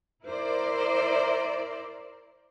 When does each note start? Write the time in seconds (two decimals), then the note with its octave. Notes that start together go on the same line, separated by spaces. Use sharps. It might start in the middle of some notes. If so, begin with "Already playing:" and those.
0.24 E4 A#4 C5 D5